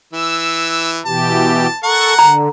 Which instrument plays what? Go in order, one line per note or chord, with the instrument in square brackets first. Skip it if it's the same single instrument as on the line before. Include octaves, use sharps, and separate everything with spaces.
[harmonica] E3 [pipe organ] E6
[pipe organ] B2 E3 G4 [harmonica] A5
[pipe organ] A4 C#6 [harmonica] A#4 F#5
[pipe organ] D3 [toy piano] A#5